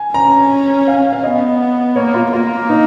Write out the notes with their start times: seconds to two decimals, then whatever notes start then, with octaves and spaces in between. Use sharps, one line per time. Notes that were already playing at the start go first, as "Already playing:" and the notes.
Already playing: G#5
0.14 C#4 A#5
0.88 F5
1.13 F5
1.24 B3 D#5
1.96 A#3 C#5
2.14 F4
2.32 A#3 F4
2.69 D#4